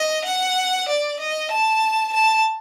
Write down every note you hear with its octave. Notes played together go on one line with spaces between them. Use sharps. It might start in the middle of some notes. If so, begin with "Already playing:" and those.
Already playing: D#5
F#5
D5
D#5
A5
A5